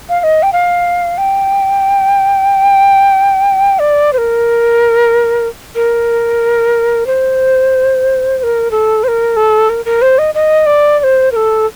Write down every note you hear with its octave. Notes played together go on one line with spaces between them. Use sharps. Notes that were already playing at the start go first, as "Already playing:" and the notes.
F5
F5
D#5
G5
F5
G5
D5
C5
A#4
A#4
C5
C5
A#4
A4
C5
A#4
A4
A#4
A#4
C5
D#5
D#5
D5
D5
C5
A#4
A4